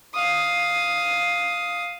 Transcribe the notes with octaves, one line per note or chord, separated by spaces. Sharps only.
F5 D#6